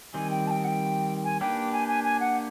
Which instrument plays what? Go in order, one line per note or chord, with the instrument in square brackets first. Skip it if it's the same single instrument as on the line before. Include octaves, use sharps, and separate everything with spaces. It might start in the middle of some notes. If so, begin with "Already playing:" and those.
[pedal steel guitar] D#3 G3 C4 [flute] G#5
[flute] G5
A5
G5
F#5
G5
G#5
[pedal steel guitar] A#3 D4 G4 B4 [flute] G5
[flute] G#5
G#5
G#5
F#5